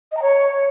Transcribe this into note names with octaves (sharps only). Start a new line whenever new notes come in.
D#5
A#5
C#5